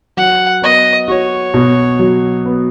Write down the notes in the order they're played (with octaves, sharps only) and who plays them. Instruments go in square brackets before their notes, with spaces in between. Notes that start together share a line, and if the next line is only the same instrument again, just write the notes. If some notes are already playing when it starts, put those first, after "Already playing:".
[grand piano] F#3 [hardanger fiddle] F#5
[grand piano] B3 [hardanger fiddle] D#5
[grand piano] F#4 [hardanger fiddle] C#5
[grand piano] B2
F#3
B3